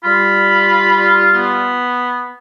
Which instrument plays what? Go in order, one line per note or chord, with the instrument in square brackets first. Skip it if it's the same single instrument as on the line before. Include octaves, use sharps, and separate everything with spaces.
[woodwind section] G3 F4 [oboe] B5
[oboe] B3